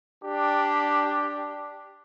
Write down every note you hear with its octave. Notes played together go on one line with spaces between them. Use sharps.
D4 G4